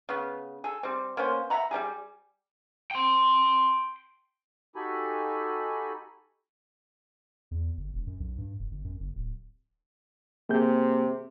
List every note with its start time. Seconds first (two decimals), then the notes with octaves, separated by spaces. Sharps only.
0.09 C#3 B3
0.64 G#4 A4
0.83 G3 C4
1.17 A#3 B3 C#4 C5
1.50 E5 F#5 A#5 B5
1.71 G3 C#4 G4 G#4
2.91 G5 C6
4.76 D#4 F#4 G4 A4 G#5 B5
7.51 E2
7.77 G1
7.93 E1
8.07 F#2
8.20 B1
8.38 G2
8.59 F1
8.71 G1
8.84 F#2
8.99 F#1
9.15 D1
10.49 C3 A#3 G#4 G6